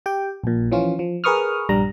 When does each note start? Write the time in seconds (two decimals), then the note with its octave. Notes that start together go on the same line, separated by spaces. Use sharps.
0.06 G4 G5
0.44 A#1 A#2
0.72 E3 F3 C#4 F4
0.99 F3
1.24 G#4 A#4 B4 C#6 D#6 F6
1.69 A#1 G2 G3 A#5